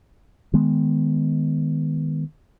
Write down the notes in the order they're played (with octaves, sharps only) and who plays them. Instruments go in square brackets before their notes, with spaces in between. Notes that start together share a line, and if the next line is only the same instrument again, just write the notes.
[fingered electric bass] D#3 G#3 B3